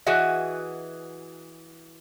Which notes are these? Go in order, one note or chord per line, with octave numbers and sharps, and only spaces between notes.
E3 F#4 G#4 D#5 E5